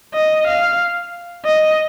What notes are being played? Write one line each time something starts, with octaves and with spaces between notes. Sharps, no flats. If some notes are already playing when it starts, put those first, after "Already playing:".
D#5
F5
D#5